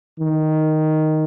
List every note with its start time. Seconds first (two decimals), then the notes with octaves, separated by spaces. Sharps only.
0.19 D#3